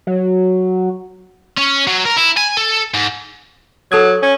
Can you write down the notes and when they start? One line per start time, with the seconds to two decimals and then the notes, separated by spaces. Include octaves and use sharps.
0.07 F#3
1.58 C#4
1.87 F#3
2.05 A#4
2.16 E4
2.37 G#5
2.57 A4
2.94 G#2
3.92 F#3 A4 D#6 G#6
4.22 C#4